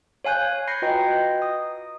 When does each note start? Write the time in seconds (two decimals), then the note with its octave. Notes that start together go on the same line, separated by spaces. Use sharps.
0.25 C#5 F5 G#5 F#6 G6
0.67 B5 G6 G#6 A#6 C7 C#7
0.82 F4 F#4 B4 D#5 G5 A#5
1.42 D#6